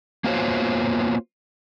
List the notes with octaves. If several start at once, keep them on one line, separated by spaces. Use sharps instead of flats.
A#3 B3 F4 F#4 C5 C#5